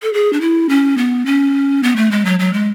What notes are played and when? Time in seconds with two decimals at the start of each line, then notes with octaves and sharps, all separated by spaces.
0.02 A4
0.13 G#4
0.33 D4
0.41 E4
0.69 C#4
0.98 B3
1.26 C#4
1.83 B3
1.96 A3
2.11 G#3
2.25 F#3
2.39 F#3
2.53 G#3